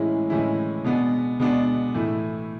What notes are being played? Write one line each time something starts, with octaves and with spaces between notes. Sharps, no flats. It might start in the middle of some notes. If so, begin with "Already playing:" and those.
Already playing: A2 E3 G#3 C#4 E4
A2 E3 G#3 C#4 E4
B2 G#3 B3 D4
B2 G#3 B3 D4
A2 E3 A3 E4